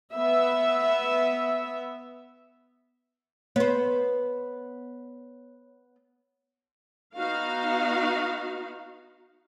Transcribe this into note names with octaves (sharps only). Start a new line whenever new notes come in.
B3 E5
B3 C5 C#5
B3 D#4 F#4 F5